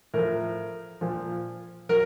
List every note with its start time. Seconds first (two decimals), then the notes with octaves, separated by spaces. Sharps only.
0.14 A2 F3 A#4
1.01 A#2 F3
1.89 F#3 A#4